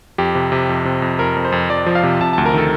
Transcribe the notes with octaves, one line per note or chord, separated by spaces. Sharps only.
F2 G4
C3
C3
F2
C3
F2
F2 A#4
F2
C5
F2
F2 D5
F3
F5
C3
C3 A5
D2 A5
A#4
D#3 A4